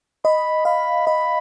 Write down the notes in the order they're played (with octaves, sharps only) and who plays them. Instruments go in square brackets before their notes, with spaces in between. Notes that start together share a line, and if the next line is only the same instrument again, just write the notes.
[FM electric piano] D#5 [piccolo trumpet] B5
[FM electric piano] F5 [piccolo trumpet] B5
[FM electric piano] D#5 [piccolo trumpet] B5